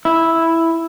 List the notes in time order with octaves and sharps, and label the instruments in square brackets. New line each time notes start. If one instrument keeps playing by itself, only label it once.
[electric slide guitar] E4